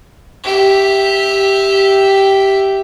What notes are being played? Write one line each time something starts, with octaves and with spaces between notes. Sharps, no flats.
G4 E5